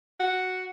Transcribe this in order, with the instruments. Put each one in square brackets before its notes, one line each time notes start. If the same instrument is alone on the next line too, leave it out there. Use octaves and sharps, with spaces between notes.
[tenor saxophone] F#4